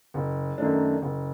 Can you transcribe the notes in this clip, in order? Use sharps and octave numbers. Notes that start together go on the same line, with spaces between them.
F#1
F#2 D#3 A3 D4
F#1